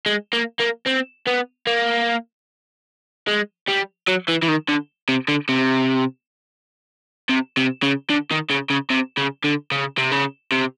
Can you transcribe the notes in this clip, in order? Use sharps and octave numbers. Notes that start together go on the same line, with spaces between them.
G#3
A#3
A#3
C4
B3
A#3
G#3
G3
F#3
E3
E3
D#3
D3
C3
D3
C3
C3
C3
C#3
D3
D#3
C#3
C#3
C3
C#3
D3
C#3
C3
C#3
C3